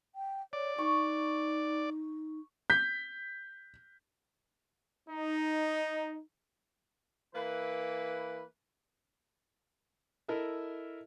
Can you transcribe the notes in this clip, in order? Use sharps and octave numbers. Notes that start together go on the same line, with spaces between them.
G5
C#5 D5
D#4 C#6
G6 B6
D#4
E3 A#3 B4
E4 A4 A#4 D#5 E5